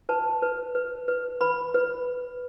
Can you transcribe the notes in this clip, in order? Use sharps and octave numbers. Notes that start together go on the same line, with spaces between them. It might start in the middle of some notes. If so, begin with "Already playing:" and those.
B4 A5
B4
B4
B4
B4 B5
B4